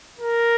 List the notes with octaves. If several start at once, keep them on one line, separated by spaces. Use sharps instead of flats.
A#4